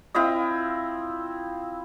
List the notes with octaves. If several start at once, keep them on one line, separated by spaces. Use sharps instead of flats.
C4 E4 F4 D#5